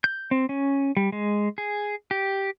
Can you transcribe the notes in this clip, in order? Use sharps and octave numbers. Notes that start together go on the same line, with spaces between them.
G6
C4
C#4
G3
G#3
G#4
G4